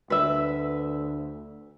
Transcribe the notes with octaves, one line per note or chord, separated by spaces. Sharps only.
D2 B4 E5